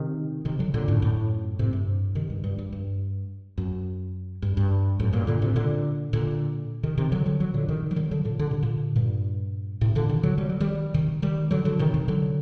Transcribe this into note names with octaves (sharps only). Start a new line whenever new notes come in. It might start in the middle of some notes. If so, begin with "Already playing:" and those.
Already playing: C3 D#3
C3 D#3
D3 F#3
A#2 D3
F#2 A2
F#2 A2
A2 C3
G2
C3 D#3
G2
G2
G2
G2
F#2
G2
G2
F#2 A2
G2 A#2
A#2 D3
A2 C3
A#2 D3
A#2 D3
C3 D#3
C3 D#3
D3 F#3
D3 F#3
D3 F#3
A#2 D3
C3 D#3
F#3
D#3 G3
D3 F#3
A#2 D3
D3
C3
A#2 D3
G2 A#2
A2 C3
A#2 D3
C3 D#3
D3 F#3
G3
F#3
D#3 G3
C3 D#3
D#3 G3
D3 F#3
D3 F#3
C3 D#3
C3 D#3
D3 F#3